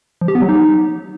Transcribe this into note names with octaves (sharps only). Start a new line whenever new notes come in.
F3
G4
B3
F#3
D#4